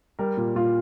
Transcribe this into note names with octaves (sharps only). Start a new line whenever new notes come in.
G3 A#4
A#2
A#2 F4